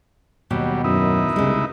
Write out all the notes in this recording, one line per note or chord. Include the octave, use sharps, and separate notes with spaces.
D#2 B2 F#3 G3
F#2 D#4 E4 B4
C2 C#3 G#3